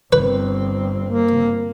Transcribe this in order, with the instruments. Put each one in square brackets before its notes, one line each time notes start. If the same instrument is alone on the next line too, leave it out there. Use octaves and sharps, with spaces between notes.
[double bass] G1 C4 [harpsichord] B4
[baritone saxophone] A#3